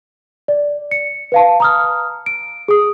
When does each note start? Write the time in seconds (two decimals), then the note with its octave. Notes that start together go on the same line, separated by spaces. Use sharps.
0.48 D5
0.91 C#7
1.32 B4 F5 A5
1.60 A#5 D#6 F6
2.26 D7
2.68 G#4 D#6